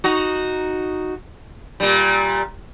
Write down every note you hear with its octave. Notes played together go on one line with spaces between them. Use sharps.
D#4 F#4
A#2 G3